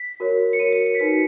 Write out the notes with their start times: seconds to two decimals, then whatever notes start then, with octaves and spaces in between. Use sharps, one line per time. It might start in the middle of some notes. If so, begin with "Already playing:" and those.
Already playing: B6
0.20 F#4 A#4 C#5
0.53 C#7
0.59 F#4 A#4 C#5 D#7
0.73 C#7
0.86 C#7
0.95 B6
0.99 D#4 F#4 B4 C#7